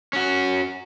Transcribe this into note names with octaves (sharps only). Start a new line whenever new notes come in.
C#4 F#4